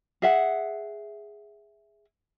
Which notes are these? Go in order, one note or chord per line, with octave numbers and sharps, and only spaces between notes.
G#4 E5 F#5